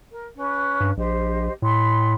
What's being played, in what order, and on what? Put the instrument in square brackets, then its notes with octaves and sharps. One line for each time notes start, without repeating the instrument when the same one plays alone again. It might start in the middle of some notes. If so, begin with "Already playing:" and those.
[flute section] A#4
C#4 B4
[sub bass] G2
[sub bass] A#1 [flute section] G4 C5 D#5
[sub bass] A2 [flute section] B5 C6